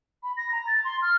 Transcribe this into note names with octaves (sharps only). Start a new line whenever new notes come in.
B5
A#6
A#5
A6
C6
F6